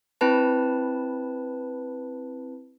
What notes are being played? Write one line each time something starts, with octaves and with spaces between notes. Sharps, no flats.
C4 E4 B4 A5